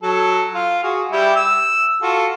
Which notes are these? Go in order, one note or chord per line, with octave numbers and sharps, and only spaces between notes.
F#3 A4
F4 F5
F#4 G#4
G3 E4 G4
E6
F4 F#4 A4